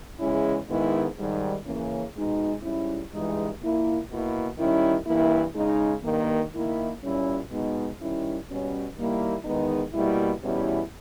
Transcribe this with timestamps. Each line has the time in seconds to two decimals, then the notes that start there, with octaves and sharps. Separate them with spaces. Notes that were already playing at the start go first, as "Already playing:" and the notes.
0.20 E2 C#3 G#3 C#4 E4
0.68 G#2 D#3 G#3 B3 E4
1.17 G#2 D#3 G3
1.66 C#3 E3 A#3 C#4
2.14 B2 G#3 D#4
2.63 G#2 G3 C#4 E4
3.11 G2 E3 G#3 D#4
3.61 A#2 A#3 E4
4.09 B2 A#3 E4
4.57 D#3 G3 C#4 E4
5.06 G2 E3 A#3 E4
5.55 C#3 G#3 D#4
6.04 G2 D#3 A#3
6.52 D#3 A#3 E4
7.01 A#2 G3 C#4 E4
7.50 B2 G#3 B3 D#4
7.99 D#3 G3 C#4 E4
8.48 B2 G3 C#4
8.96 D#3 G3 A#3 E4
9.44 E2 D#3 G#3 B3 D#4
9.93 B2 G3 A#3 E4
10.42 E2 B2 G3 C#4 E4